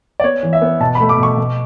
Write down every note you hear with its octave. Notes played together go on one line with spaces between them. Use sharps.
D5
B3 C#5
E3
E5
B3
B2 A5
B5
A3
D6
B2 C#6
B2